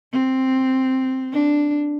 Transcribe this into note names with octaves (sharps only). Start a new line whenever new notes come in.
C4
D4